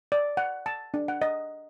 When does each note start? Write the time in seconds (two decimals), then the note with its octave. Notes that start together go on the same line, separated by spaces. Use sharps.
0.12 D5
0.37 F#5
0.66 A5
0.94 D4
1.08 F#5
1.22 D#5